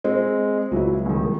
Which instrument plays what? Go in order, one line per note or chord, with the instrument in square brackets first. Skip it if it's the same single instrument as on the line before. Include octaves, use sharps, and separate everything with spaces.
[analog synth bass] G#3 [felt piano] C4
[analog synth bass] C#2 [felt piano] F#3 E4
[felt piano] C2 D#3